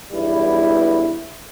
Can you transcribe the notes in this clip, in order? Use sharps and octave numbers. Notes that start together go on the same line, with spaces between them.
B1 E2 G2 G3 E4